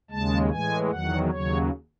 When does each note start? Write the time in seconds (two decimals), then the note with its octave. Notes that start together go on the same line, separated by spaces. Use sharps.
0.10 D#2 C#3 G#3 A5
0.51 A2 E3 G#3 G#5
0.90 E2 D#3 F#3 F#5
1.30 D#2 C#3 F#3 C#5